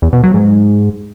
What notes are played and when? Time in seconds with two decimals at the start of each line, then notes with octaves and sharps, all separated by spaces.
0.02 E2
0.13 B2
0.23 F#3
0.34 G#2